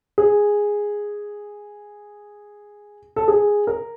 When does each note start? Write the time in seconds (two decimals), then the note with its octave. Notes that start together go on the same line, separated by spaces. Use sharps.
0.18 G#4
3.16 A4
3.28 G#4
3.67 A#4